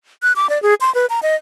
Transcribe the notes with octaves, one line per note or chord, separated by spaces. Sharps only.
F#6
D6
D5
G#4
C6
B4
A#5
D#5